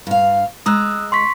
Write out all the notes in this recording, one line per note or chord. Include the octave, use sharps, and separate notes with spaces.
G2 F5
G#3 A#5 D#6 E6 F#6
C6 C#6 B6